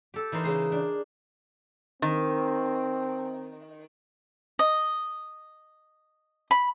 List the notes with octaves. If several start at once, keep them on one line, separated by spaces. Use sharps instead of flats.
G4 A4
E3 D#4 A#4 C5
C#3 G#4 C5
D4
D#3 C4
D#5
B5